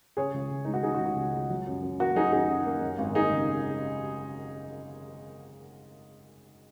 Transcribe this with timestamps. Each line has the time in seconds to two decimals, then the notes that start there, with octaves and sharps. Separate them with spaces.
0.17 C#3 G#4 C#5
0.34 C#2
0.51 C#2
0.65 G#3 D#4
0.74 F#4
0.83 C#3 D#4 G#4
0.95 F#4
1.00 C#2
1.06 F#4
1.16 C#2
1.33 G#3
1.50 F#3
1.67 F#2
1.82 F#2
2.00 A#3 F#4
2.16 F#3 D#4 G#4
2.32 F#2 D#4 G#4
2.49 F#2
2.66 A#3
2.82 F#2
2.98 G#1
3.15 A#3 D#4 G#4
3.32 C#3